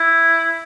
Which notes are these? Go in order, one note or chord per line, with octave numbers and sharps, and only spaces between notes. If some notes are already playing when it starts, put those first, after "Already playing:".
Already playing: E4